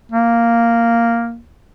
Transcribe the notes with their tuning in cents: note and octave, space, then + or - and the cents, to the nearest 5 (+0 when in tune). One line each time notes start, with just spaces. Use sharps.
A#3 -5